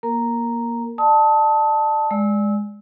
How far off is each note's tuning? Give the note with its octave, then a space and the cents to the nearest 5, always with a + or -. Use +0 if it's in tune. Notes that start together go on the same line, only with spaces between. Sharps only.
A#3 +20 A#4 -10 A#5 +0
D5 +40 A5 +0 D#6 +35
G#3 +0 D5 +0 E6 -25